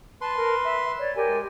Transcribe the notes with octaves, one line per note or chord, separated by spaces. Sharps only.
B4 A5 C6
A#4
E5
C#5 D5
G4 A#4 G#5
G#3